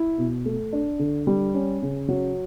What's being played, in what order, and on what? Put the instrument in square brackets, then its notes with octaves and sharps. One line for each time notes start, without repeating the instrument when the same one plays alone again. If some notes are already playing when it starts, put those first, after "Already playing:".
Already playing: [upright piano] E4
B2
A3
D4
D3
G3
C#4
C#3
F#3